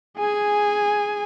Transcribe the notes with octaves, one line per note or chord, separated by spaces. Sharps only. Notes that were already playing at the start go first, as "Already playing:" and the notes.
G#4 G#5